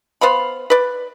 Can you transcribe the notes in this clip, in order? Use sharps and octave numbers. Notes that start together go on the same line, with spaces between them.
B3 C5 F5 B5
B4 D5